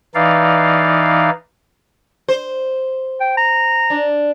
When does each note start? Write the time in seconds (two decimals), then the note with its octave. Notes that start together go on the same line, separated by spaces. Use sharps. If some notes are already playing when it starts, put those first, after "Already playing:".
0.15 E3 D#4 D5 F5
2.29 C5
3.21 G5
3.37 A#5
3.90 D4